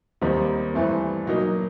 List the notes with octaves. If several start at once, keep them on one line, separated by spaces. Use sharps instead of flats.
D#2 D#3 G3 C4
G2 E3 A3 C4
B2 F#3 A#3 D#4